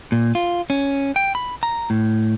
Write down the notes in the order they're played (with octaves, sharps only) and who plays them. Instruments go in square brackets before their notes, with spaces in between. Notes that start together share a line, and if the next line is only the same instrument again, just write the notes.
[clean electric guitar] A#2
F4
C#4
G5
B5
A#5
A2